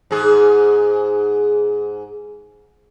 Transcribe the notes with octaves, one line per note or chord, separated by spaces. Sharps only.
G#2 G#4